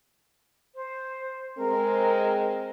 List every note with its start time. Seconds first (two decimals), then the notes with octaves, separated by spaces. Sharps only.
0.75 C5
1.57 G#3 C4 A#4